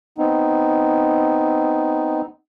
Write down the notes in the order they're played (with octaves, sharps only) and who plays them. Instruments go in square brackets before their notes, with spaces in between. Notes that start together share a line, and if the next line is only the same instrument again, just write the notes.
[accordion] B3 C4 D#4